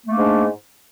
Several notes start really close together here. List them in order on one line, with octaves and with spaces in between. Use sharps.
A#3 A3 D4 G#2